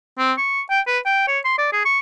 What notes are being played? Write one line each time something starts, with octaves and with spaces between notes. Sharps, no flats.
C4
C#6
G5
B4
G5
C#5
C6
D5
G#4
C#6